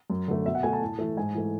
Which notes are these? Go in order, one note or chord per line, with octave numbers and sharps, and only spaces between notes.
F#2
D3 A3
B2 E5
F#5
A3 G#5
A5
A2
E3 A3
G#2 G#5
E3 A3